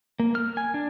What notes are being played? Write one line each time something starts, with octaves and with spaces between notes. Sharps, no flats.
A#3
F6
G#5
D4